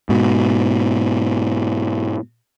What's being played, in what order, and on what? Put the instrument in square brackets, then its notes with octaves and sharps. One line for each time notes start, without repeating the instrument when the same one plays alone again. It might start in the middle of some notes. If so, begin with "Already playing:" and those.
[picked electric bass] G#2 B2